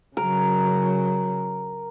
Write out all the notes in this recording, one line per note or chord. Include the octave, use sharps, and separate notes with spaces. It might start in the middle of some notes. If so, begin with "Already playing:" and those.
C#3 F#3 A#4